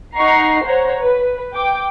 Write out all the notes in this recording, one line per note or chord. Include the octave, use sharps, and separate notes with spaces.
D#4 F#5 A#5 C#6 C7
C5 C#5 F#5 A#5
B4
G5 D6